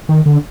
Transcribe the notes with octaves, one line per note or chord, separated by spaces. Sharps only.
D#3
D3